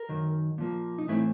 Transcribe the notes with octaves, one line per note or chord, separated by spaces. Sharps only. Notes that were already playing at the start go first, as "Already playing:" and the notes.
Already playing: A#4
F#2 D#3 F#3
A#2 F3 A#3
D#4
A2 E3 A3 C4 E4